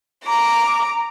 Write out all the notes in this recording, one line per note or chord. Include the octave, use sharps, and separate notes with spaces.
A#5 D6